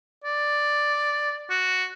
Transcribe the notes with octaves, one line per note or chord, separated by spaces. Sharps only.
D5
F#4